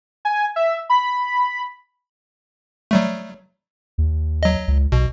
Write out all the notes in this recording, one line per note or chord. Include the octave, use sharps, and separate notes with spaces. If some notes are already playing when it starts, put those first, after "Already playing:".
G#5
E5
B5
F#3 G3 A3
D#2
F#3 D#5
C#2
B1 B2